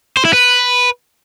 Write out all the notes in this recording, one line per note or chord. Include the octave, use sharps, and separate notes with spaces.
C5
E4
B4